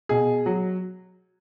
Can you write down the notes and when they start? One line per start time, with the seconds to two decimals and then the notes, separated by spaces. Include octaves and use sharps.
0.09 B2 G#4
0.46 F#3